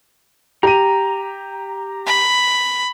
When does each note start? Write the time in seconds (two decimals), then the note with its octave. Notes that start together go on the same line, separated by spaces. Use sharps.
0.63 G4 A#5 D#7
2.06 B5